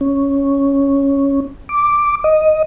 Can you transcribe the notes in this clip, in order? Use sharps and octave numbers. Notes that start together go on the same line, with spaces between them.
C#4
D6
D#5